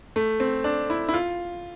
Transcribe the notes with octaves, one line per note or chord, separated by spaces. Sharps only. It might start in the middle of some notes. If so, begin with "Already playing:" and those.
A3
C4
D4
E4
E4
F4